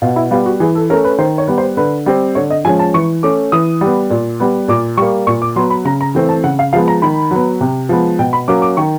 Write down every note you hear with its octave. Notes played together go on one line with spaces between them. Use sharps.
B2 F4
E4
G3 B3 F4
F#4
E3 G#4
A4
A3 C#4 A#4
B4
D#3 C5
C#5
G3 B3
C5
D3 B4
G3 C4
D3 C#5
D#5
F3 G#3 C#4 G#5
A5
E3 C#6
A3 C#4 D6
E3 D#6
G3 B3
A#2
G3 B3
A#2 D6
G3 A#3 C#6
A#2 C#6
D6
F#3 B3 C6
B5
C#3 A#5
A#5
E3 A3 C4
A5
C#3 F#5
F5
F3 G#3 B3 F5
A#5
D#3 B5
F#3 B3
C3
F3 G#3 B3
B2 G5
B5
F#3 A#3 C#4 D6
D6
D#3 C#6